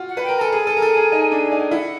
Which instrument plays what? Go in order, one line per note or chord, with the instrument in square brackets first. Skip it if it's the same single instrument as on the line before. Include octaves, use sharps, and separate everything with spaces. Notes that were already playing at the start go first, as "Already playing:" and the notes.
Already playing: [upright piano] F4 F#4
[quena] F#5
[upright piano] B4
[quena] G5
[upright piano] A#4
[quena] A#5
[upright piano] A4 [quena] G#5
[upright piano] G#4
A4
A#4
A4
G#4
D#4
D4
D#4
[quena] G5
[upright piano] E4 [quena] F#5